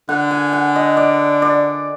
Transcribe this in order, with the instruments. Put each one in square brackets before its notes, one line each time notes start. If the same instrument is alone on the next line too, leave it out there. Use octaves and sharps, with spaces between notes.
[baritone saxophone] D3 [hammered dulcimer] F#5
[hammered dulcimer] G#5
F#5
D#5
D5
D5